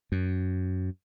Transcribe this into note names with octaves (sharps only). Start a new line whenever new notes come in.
F#2